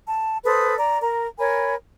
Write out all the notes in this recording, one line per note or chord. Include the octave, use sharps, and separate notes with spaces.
A5
A4 B4 C5 D#6
D5 A#5
A#4 A#5
A#4 C#5 G#5 B5